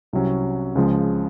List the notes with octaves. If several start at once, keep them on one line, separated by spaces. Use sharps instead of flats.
C2 C3 F#3 C#4
C#2 C#3 F3 G#3